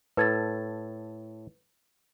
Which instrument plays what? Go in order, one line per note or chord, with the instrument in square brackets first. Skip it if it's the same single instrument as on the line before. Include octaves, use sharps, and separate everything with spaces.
[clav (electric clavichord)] A2 A4 [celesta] B4 G#6 A6